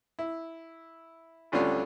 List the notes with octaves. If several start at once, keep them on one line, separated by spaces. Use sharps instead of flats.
E4
G#1 D2 D3 G3 C#4 F4